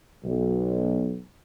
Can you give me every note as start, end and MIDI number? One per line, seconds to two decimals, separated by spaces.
0.24 1.17 35